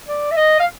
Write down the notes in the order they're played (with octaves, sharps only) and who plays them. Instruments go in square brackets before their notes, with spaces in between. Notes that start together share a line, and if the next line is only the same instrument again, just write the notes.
[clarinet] D5
E5
D#5
F5